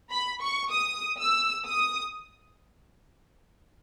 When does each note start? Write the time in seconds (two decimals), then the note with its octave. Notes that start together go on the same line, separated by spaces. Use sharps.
0.11 B5
0.42 C#6
0.72 D#6
1.19 E6
1.66 D#6